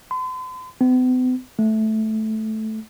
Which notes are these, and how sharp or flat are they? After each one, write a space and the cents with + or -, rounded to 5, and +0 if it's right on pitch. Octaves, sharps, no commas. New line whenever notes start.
C6 -45
B3 +45
A3 -10